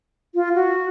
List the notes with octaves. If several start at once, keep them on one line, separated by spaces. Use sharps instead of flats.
F4
F#4